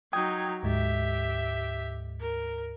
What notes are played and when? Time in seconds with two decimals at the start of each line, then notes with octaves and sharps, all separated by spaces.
0.13 F#3 D#4 G5 D#6 G#6
0.63 D2 G#2 G4 E5
2.21 A#4